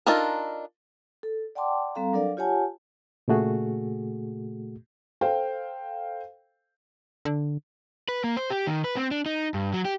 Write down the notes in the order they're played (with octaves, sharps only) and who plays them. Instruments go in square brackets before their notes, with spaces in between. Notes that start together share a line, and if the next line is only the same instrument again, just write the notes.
[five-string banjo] D4 D#4 F4 A4 A#4
[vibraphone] A4
D5 F#5 G5 A5 C6 D6
G3 C4 A4 F5 A#5
F#3 D4 A4 A#4 D5 F5
F4 G4 C#5 F#5 G#5 A5
[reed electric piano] A#2 C#3 A3 F#4 G#4
[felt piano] A4 C5 F5 G5
[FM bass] D3
[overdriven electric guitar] B4
A#3
C5
G4
D#3
B4
C4
D4
D#4
G2
F#3
G4